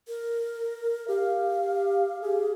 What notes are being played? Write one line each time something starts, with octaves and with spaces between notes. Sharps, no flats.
A#4
G4 F5
G4 G#4